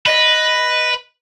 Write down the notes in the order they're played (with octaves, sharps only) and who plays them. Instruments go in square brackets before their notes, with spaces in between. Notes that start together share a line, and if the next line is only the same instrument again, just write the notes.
[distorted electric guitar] B4 [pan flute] D#5